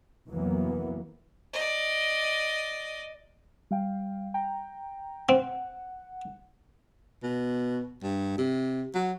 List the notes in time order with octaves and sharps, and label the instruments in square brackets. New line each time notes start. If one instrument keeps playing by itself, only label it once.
[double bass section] C2 F2 E3 F#3 A#3 B3
[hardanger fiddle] D5 D#5
[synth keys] G3 F5 G5
G5 A#5
[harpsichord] C4 [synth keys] F#5
[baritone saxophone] B2
G2
C3
F#3